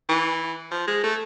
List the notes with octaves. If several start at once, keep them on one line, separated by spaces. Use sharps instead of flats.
E3
F3
G#3
A3